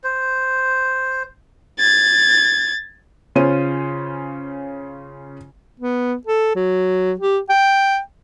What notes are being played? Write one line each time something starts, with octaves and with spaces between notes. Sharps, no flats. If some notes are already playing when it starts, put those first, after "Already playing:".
C5
G#6 A6
C#3 C#4 F4 C5 D#7
B3
A4
F#3
G4
G5